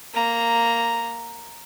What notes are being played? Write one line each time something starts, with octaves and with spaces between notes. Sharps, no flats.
A#3 A#5